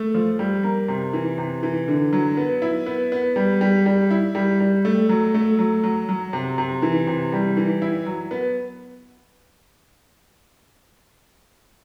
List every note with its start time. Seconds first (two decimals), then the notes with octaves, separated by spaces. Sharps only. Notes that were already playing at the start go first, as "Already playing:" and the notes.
Already playing: A3
0.14 F3
0.39 G3
0.63 A#3
0.88 C3
1.13 E3
1.38 C3
1.63 E3
1.88 D3
2.13 F#3
2.37 B3
2.62 E4
2.86 B3
3.12 B3
3.36 G3
3.61 G3
3.86 G3
4.11 E4
4.35 G3
4.60 G3
4.85 A3
5.09 F#3
5.34 A3
5.59 F#3
5.84 F#3
6.09 F#3
6.33 C3
6.58 C3
6.82 E3
7.07 C3
7.32 G3
7.57 E3
7.82 E4
8.06 F#3
8.31 B3